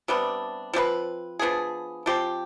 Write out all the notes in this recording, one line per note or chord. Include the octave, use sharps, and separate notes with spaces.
C3 G3 B3 D4
F3 C4 G4 B4
F3 B3 D4 G#4
F3 C4 G4